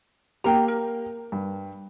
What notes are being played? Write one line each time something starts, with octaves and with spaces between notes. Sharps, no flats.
A#3 G4 G5 A#5
A#4
G2